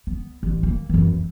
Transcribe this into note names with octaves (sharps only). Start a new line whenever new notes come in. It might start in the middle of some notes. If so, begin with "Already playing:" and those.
B3
A1
A#3
F#2 E3
E3